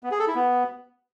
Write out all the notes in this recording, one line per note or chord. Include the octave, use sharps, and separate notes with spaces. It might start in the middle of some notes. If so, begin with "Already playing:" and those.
B3
G#4
A4
E4
B3